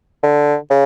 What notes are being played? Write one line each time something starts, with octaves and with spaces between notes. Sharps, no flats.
D3
C#3